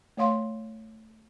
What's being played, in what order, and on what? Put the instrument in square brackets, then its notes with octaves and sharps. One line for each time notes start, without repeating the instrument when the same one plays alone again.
[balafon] A3 C#5 F5 C6